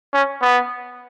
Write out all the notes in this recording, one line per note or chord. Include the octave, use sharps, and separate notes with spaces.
C#4
B3